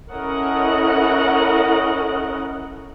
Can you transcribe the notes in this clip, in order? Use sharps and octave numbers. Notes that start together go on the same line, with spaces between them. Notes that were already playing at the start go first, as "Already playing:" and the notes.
C#4 E4 A4 A#4 D#5 F#5